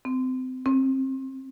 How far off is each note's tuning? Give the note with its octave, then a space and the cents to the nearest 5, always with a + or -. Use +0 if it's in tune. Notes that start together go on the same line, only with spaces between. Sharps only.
C4 -30
C4 +25